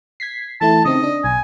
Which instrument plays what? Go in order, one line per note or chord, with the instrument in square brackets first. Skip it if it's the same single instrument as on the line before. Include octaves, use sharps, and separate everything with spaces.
[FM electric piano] G#6 B6 C7
[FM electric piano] E3 A3 E4 [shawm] A5
[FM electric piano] C#3 C4 D#4 [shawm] D#5
[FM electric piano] D4
[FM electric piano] B1 [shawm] G#5